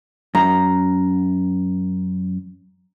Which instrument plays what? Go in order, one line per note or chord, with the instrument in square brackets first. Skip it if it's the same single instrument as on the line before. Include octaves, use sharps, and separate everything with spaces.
[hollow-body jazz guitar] F#2 [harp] A#5